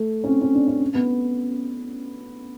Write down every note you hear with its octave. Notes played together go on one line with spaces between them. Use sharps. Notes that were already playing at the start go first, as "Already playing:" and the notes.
Already playing: A3
C#4
C4
C#4
D4
C#4
B3